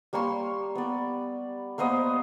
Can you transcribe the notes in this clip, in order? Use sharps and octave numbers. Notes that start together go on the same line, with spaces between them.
G3 A#3 C#5 C6
B3 D5
A#3 B3 C5 D#5